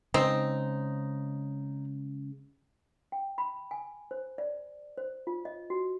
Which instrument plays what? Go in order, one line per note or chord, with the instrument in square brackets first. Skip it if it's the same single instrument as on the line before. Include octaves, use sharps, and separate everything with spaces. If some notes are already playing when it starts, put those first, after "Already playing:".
[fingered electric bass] C#3 G#3 [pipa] C4 D#4
[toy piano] G5
B5
G#5
C5
D5
C5
F4
D#5
F#4